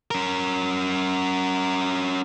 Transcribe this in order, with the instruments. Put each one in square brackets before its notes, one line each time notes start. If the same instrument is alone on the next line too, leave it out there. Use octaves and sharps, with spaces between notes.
[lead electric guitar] C#4 A#4